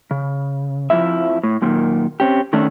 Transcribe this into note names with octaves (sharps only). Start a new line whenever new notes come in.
C#3
F2 D#3 F3 E4 E5
A2
F#2 A#2 D#3
C4 C#4 G4
D#3 A3 C#4 D4